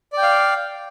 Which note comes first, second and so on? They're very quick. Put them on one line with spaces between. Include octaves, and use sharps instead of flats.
D5 G5 F5